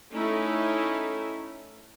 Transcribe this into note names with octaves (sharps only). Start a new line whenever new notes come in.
A3 C#4 D#4 E4 A4